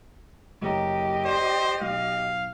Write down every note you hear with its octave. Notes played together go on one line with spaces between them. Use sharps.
F#1 G4 C#5 D#5 A#5
C5 D5 G5
B1 F5